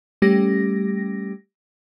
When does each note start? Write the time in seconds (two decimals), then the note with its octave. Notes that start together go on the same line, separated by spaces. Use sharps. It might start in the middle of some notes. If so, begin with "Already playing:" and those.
0.22 G3 A3 C#4 G4 A#6